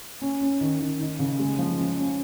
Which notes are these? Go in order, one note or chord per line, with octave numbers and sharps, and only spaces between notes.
C#4
C#4
D#3
D#3
D#4
C#3
G#3
F3
C#4
C#4